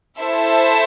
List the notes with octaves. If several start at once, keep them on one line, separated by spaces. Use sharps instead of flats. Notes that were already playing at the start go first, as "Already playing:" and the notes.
E4 A4 C5 E5